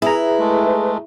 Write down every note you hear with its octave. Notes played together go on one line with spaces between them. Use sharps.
E4 G#4 B4 A#5
G#3 A3